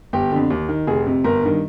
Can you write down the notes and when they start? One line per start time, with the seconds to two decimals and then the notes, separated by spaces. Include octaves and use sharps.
0.13 G1 G4
0.31 F2 D3
0.50 D#2
0.69 D#3
0.87 F1 G#4
1.06 F2 C3
1.24 G1 A#4
1.43 G2 D#3